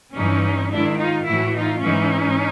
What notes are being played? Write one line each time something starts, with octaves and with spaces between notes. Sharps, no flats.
G2 E3 C#4 D#4
G#2 D#3 D4 E4
D#4 F4
A2 E3 E4 F#4
D#4 F4
G#2 E3 C#4 D#4